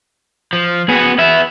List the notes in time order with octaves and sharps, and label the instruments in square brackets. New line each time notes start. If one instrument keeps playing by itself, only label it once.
[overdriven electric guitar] F3
[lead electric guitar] B3 [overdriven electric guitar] F#4 G#4
[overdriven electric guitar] B3 E4 [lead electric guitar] E5